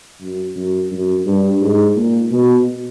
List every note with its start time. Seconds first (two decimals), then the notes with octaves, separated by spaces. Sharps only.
0.21 F#2
0.56 F#2
0.91 F#2
1.26 G2
1.61 G#2
1.96 A#2
2.31 B2